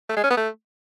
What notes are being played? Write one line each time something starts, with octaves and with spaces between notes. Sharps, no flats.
A3
G#3
C#4
B3
A3